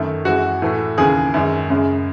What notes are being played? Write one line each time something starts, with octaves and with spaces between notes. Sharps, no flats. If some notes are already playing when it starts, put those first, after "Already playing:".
Already playing: F#2 D#3 A3
F#2 E3 G#3 F#4
A2 E3 A3
D#2 C#3 E3 G#4
F#2 D#3 G#3
F#2 C#3 G#3